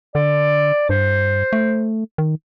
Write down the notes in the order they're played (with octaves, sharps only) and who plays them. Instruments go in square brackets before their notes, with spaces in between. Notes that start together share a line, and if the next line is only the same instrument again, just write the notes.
[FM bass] D3 [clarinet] D5
[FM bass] G2 [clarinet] C5
[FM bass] A3
D#3